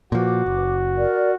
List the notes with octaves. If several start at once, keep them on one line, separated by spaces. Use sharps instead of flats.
A#2 F3 F#4 B4 D6
F#1
A#4 D5